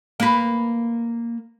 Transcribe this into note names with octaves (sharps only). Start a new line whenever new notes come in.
A#3 B4